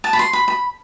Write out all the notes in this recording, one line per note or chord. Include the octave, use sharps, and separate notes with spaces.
A5
B5
C6
B5
B5